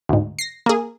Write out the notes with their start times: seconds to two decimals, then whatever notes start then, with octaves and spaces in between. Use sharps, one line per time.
0.09 D2 G#2
0.39 A#6 C7
0.66 A#3 G#4